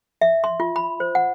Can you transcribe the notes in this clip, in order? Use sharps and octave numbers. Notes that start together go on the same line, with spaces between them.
E5
C6
F4
B5
C5
F#5